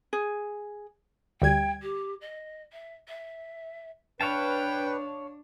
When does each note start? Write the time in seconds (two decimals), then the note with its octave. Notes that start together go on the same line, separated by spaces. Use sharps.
0.13 G#4
1.42 D2 G3 G5 G#6
1.82 G4
2.21 D#5
2.73 E5
3.08 E5
4.21 D4 B4 C#5 F5 G5 A5